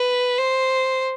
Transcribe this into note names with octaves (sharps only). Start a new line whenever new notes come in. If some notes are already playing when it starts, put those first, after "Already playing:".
Already playing: B4
C5